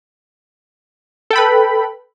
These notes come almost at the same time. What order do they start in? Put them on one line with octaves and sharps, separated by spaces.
A4 G5 B5 B4